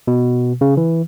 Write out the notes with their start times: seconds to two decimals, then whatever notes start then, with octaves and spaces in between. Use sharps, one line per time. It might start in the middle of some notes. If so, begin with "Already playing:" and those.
0.07 B2
0.61 C#3
0.77 E3